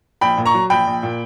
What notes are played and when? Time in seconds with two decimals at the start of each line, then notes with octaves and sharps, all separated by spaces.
0.21 A#1 G5 B5
0.37 A#2
0.46 A#5 C#6
0.54 F#3
0.70 A#1 G5 B5
0.87 A#1
1.03 A#2